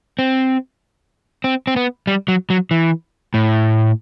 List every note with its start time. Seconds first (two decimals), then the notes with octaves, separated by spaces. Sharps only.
0.19 C4
1.44 C4
1.67 C4
1.76 B3
2.07 G3
2.28 F#3
2.50 F#3
2.71 E3
3.34 A2